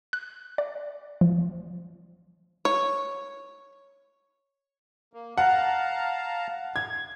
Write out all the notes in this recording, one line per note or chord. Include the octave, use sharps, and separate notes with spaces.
F#6
D5
F3
C#5
A#3
F5 F#5 A5 A#5
G#6